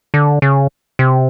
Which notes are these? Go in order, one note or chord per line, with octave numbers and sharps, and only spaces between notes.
D3
C#3
C3